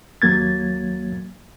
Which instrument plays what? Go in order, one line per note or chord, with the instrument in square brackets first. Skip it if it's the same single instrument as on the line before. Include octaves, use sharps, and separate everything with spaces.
[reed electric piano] D#2 F#3 A#3 G#6 A6